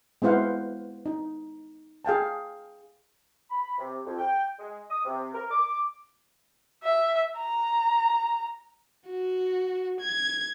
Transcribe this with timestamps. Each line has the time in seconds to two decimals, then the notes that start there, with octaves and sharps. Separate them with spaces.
0.22 G#3 B3 E4 C5 F5 F#5
1.06 D#4
2.05 G#4 F5 G5 A5
3.50 B5
3.78 C3
4.05 F2
4.18 G5
4.58 G#3
4.90 D#6
5.05 C3
5.33 A#4
5.50 D6
6.84 E5
7.38 A#5
9.08 F#4
10.00 G#6